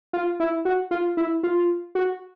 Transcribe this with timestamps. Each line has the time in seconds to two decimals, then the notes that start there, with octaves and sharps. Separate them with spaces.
0.13 F4
0.40 E4
0.65 F#4
0.91 F4
1.17 E4
1.43 F4
1.95 F#4